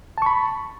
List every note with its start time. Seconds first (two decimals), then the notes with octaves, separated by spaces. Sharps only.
0.18 A5
0.22 C#6
0.26 B5